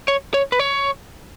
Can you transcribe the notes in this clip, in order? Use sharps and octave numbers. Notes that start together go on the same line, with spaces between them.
C#5
C#5
B4
C#5